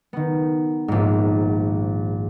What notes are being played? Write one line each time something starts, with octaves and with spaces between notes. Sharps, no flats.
D#3 B3
A#1 G#2